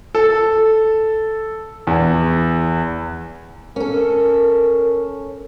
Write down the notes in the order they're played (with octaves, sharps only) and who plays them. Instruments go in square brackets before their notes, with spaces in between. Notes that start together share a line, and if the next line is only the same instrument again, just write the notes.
[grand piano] A4
E2
[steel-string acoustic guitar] C#4 A4 [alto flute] A#4